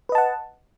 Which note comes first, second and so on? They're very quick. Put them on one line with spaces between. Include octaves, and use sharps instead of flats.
B4 D#5 A5 F#5